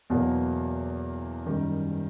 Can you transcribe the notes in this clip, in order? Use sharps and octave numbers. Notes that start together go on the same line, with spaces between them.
E2 B2 F#3 A#3
F#2 D#3 G3